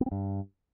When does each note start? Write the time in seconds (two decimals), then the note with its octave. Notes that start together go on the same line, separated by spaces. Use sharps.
0.01 B3
0.06 C4
0.12 G2